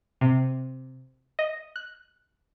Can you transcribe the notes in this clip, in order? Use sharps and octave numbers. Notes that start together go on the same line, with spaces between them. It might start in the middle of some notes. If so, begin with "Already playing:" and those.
C3
D#5
F#6